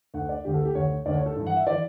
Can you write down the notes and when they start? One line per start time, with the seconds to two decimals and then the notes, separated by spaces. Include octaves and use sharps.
0.14 D2 D3 F#5
0.29 D5
0.45 D2 D3 G4
0.54 A4
0.65 G4
0.75 D2 D3 C#5
1.06 D2 D3 D5
1.15 C#5
1.26 A4
1.36 G2 E3
1.47 F#5
1.56 E5
1.67 E3 D5